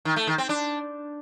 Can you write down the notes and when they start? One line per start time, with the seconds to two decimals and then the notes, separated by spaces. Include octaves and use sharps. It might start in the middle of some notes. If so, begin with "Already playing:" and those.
0.05 D#3
0.16 A3
0.27 D#3
0.38 C4
0.49 D4